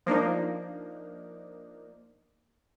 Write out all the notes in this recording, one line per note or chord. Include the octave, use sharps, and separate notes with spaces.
F3 A#3 D4 D#4